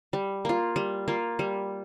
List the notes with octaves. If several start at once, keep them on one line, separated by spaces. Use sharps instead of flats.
G3
A#3 F4
G3
A#3 F4
G3